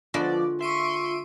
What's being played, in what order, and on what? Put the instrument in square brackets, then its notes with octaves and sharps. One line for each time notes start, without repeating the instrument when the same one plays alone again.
[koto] D3 G#3 F#4 [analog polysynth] F3 B3 D5 [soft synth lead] F4
[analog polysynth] E5 D7 D#7 [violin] C6 C#6